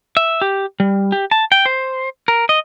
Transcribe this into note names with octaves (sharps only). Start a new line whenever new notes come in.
E5
G4
G3
G4
A5
G5
C5
A#4
D#5